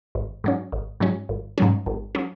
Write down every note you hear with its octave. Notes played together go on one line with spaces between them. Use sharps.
G#1
G#2 F#3 C#4
G#1
G#2 F#3 C#4
G#1
G#2 F#3 C#4
G#1
F#3 C#4